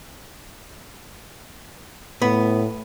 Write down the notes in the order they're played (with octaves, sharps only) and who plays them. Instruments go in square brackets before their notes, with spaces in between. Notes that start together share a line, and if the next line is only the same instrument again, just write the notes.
[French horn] A2 [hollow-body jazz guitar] B3